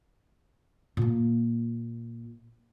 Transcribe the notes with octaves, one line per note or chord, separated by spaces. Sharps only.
A#2 A#3